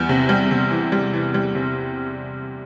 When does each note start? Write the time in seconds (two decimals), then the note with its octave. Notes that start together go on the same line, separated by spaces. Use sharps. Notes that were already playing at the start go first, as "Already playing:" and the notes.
Already playing: E2 G3
0.09 C3
0.29 G3
0.51 C3
0.71 E3
0.92 G3
1.13 E3
1.34 G3
1.55 C3